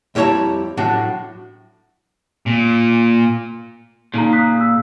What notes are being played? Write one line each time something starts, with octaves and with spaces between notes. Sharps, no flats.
F2 G3 E4 C#5 A5 A#5
A2 F#3 D4 F#4
A#2
A#2 C#3 D#4 A#5
D#6 F#6 B6
E6